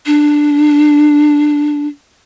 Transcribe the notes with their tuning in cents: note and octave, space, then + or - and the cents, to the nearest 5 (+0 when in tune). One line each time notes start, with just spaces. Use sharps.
D4 +5